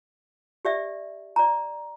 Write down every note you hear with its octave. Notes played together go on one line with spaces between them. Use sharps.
G4 D5 E5
D5 A#5